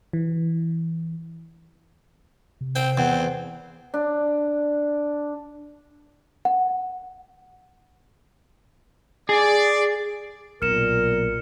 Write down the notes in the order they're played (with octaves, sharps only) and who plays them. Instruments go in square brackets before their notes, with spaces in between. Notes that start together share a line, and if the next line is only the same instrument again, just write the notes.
[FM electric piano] E3
[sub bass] C3
[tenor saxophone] C4 [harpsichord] G5
[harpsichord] E2 [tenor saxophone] C4 [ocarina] F#5
[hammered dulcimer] D4
[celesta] F#5
[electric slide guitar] G#4 [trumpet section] D5
[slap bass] B1 [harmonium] A#2 [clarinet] A#4 [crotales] F6 C#7 E7